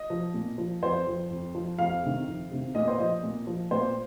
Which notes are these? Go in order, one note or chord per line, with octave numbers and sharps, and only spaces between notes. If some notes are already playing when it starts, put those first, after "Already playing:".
Already playing: D#5
F3
A#2
F3
F2 C5
F3
F2
F3
F2 F5
C3 D#3
F2
C3 D#3
A#2 D#5
C5
F3 D#5
A#2
F3
A#2 C5